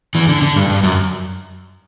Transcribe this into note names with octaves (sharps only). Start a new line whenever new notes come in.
E2 E3
D3
D3
G2
G2
F#2